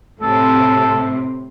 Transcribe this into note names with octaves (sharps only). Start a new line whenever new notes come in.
A2 C3 C4 A4